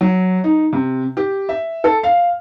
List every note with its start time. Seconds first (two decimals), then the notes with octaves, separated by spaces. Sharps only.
0.01 F#3
0.44 D#4
0.73 C3
1.17 G4
1.49 E5
1.84 A4
2.03 F5